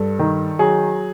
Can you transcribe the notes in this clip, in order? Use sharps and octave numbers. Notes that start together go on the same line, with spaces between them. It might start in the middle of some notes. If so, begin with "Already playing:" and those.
Already playing: G2 A4
D#3
F#3 G#4